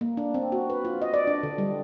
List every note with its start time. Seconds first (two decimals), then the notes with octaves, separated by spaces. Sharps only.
0.01 A#3
0.17 D4
0.34 C4
0.52 F#4
0.70 B4
0.85 F4
1.02 D#5
1.14 D5
1.27 D4
1.43 D3
1.58 G3